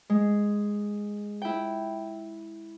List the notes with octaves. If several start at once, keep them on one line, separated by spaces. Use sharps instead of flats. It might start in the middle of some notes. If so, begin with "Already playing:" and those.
G#3
E4 G5